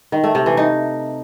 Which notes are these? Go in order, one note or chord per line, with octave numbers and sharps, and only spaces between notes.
D#3
A3
C3
E3
D#4